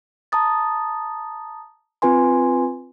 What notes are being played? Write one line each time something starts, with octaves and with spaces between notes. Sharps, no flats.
A5 A#5 D#6 A6
C4 F4 B4 G#5 C6